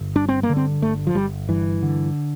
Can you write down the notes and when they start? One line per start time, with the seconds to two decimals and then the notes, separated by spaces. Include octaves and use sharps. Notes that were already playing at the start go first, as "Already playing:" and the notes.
Already playing: G1
0.15 G2 D4
0.29 C4
0.43 A#3
0.49 D3
0.57 C4
0.82 G1 A3
1.07 F3
1.15 G1 G3
1.49 G2 E3
1.82 D3